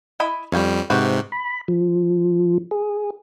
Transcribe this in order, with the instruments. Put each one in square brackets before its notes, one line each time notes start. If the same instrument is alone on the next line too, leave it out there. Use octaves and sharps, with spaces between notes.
[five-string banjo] E4 D#5 B5
[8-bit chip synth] F2 G3 [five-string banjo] C#4 F5 G5
[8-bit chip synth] G#2 C3 [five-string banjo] F#4 G4 B4
[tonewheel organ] B5
F3
G#4